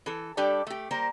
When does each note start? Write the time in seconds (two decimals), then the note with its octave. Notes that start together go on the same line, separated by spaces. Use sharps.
0.06 E3 A4
0.37 G3 D4 G4 A4 D5
0.67 A3 G4
0.91 G3 A#3 A#4 C5